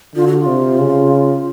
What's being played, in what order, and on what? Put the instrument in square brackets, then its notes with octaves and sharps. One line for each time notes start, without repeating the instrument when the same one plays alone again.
[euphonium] D3 [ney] F4
[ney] F#4
F4
[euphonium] C3
C#3